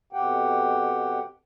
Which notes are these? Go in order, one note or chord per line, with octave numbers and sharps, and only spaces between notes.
F2 B2 G4 F#5 G5